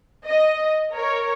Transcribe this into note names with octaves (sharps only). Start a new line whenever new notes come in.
D#5
A#4 C#5